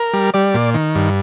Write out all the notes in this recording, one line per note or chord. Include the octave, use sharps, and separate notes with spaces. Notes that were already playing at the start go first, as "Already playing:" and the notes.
Already playing: A#4
G3
G3 D5
A#2
D#3
G2